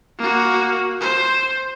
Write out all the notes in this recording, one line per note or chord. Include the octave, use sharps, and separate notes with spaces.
A#3 F#4
C5